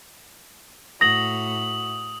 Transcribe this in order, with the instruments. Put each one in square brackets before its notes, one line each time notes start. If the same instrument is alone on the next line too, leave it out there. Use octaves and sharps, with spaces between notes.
[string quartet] A2 F#4 [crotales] D#6 F#7 [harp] A#6